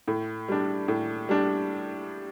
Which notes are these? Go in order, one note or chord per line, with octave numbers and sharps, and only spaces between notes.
A2
G3 D4
A2
G3 D4